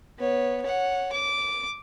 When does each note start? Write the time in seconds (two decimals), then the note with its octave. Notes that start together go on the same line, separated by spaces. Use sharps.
0.18 B3 C#5
0.62 C#5 F#5
1.12 D6